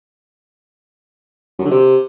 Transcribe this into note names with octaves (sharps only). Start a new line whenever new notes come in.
F#2
D3
C3